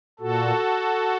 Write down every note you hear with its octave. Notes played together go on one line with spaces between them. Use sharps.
A#2 F#4 A4